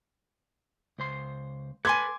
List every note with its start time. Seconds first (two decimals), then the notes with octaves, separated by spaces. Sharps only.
0.98 C#2 C5 C6
1.85 A4 B4 G#5 C6 D6 G#6